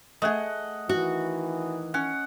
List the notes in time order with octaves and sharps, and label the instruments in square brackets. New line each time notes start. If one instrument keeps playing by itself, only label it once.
[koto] A3 G#4 [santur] D#5 F#5
[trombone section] D#3 E3 [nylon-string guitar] F#4
[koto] C#4 [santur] F#5